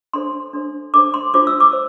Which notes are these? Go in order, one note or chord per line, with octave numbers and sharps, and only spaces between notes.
D4 A4 C5 C6
D4 A4 C5
D4 A4 C5 D6
C6
D4 F4 A4 C5 D6
E6
D6
C5